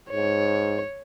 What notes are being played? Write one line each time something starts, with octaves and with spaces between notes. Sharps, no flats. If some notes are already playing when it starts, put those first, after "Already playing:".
G#2 C#5